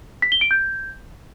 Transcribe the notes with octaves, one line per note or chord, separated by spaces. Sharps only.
B6
G7
D7
G6